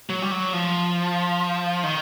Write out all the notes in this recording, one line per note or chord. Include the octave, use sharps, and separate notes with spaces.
F#3
G3
F#3
F3
D#3